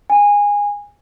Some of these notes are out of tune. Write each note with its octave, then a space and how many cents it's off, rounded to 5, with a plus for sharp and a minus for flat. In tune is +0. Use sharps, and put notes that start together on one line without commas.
G#5 -20